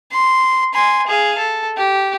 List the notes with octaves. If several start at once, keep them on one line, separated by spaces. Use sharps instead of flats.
C6
G#5 C6
G#4 F5
A4
G4